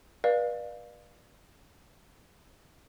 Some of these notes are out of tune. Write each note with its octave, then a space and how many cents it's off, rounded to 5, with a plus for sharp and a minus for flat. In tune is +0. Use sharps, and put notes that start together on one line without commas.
B4 -35 D5 +30 F5 +0